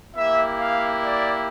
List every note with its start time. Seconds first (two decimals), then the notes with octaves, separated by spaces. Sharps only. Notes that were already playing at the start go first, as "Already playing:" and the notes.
0.14 A#3 E4 G4 E5
0.57 F5
1.02 D5